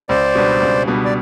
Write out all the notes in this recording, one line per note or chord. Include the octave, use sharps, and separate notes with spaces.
C#2 C5 D5
B2 G3 B3 D4
C#2
B2 G3 B3 D4
D5